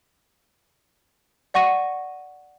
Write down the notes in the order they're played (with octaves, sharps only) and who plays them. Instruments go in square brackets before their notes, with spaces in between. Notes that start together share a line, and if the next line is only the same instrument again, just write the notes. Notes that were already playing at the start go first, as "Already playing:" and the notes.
[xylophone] D5 F#5 C#6 A#6 D#7